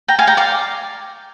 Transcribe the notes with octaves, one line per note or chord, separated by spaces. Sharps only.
G5 A#5
F5 G#5
G5 A#5
D5 F5